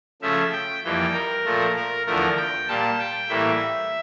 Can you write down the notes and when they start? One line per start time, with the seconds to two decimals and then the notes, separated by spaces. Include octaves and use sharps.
0.22 C#3 F3 A3 E5
0.52 G5
0.84 F2 E3 G3 A#3 G5
1.14 A#4
1.45 A#2 F3 A3
1.76 A#4
2.06 E2 D3 F3 A3 A#4
2.37 G5
2.68 A#2 G3 A#3 A5
2.99 G5
3.29 A2 E3 G3 A#3 E5